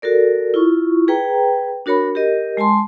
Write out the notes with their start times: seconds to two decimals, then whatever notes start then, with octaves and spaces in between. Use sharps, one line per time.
0.02 F#4 A4 A#4 D5
0.54 E4 F4 C#6
1.08 G#4 B4 G5 A#5
1.86 D4 F#4 A#4 C#5 B5
2.15 G4 A#4 D#5
2.57 G#3 G#5 A5 C6